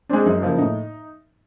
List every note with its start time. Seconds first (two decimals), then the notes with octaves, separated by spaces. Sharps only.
0.09 G#3 C4 D4
0.26 F#2 D#4
0.42 C#3 F3 A#3
0.58 A2 D#4